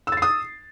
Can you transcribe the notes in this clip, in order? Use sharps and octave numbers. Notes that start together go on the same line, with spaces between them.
D#6 E6 A6 C7